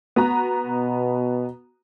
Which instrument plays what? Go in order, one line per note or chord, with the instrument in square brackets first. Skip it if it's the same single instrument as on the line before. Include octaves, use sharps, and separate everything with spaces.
[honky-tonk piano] B3 F#4 A#5
[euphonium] B2